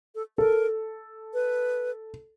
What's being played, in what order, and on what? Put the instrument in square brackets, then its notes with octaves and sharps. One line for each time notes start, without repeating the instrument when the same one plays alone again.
[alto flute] A4
[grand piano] A4 [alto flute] A#4
[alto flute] B4